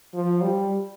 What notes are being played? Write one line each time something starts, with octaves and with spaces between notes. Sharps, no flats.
F3
G3